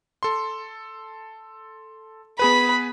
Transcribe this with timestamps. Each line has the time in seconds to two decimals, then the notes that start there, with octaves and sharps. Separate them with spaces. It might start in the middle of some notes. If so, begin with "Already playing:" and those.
0.23 A4 C6
2.39 B3 G#4 B4 B5